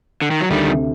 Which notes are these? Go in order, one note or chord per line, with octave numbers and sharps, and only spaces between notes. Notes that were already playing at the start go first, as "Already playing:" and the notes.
D3
D#3
F#3
D2 D#3 G3
C3